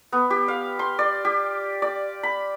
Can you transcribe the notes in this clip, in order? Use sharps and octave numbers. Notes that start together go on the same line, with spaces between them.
B3
G4
F5
C6
D5
G4
D5
B5